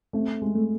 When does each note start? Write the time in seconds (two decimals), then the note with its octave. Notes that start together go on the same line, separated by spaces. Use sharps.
0.13 A3 C4
0.42 G#3
0.55 A3